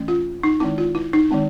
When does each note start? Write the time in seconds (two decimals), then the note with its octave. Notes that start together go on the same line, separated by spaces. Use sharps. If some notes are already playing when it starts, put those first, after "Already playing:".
Already playing: E3 A3 C#4
0.08 F4
0.43 D#4
0.60 D#3 G#3 C4 E4
0.78 F4
0.95 E4
1.13 D#4
1.31 D#3 G#3 C4